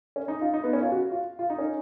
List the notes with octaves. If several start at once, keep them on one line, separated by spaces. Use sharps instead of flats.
C#4
D#4
F4
D#4
B3
C#4
F4
F#4
F4
F4
D#4
C#4